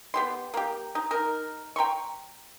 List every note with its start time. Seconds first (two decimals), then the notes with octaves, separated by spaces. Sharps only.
0.14 B3 G4 C6
0.54 A#3 G4
0.95 D#4
1.11 D#4 A#4
1.76 G5 A#5 C6 C#6